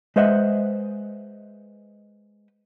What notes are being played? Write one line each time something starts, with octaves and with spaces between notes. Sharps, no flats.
G#3 B4 C5 D#5 E5 F#5